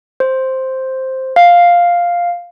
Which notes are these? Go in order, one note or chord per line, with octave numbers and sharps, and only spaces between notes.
C5
F5